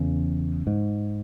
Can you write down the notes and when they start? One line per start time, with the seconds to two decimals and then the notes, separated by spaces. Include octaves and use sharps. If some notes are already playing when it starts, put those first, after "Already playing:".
Already playing: E2 C#3
0.67 G#2